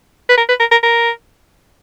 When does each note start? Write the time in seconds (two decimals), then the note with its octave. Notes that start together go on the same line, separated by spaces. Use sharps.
0.29 B4
0.38 A#4
0.49 B4
0.60 A#4
0.71 A#4
0.83 A#4